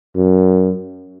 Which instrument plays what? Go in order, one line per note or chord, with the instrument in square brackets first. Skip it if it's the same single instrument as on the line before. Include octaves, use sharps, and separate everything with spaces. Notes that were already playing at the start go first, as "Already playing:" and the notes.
[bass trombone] F#2